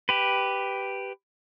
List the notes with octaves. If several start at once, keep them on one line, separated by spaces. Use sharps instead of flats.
G4 B4